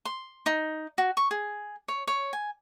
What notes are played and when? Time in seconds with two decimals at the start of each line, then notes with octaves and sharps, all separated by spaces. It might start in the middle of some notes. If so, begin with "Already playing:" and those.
0.05 C6
0.46 D#4
0.98 F#4
1.17 C#6
1.31 G#4
1.88 C#5
2.07 C#5
2.33 G#5